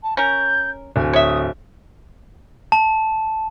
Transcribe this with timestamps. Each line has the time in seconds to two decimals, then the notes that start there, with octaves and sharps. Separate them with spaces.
0.03 A5
0.17 C#4 A#4 G6
0.96 D1 G#5
1.13 C#5 E5 D#6
2.72 A5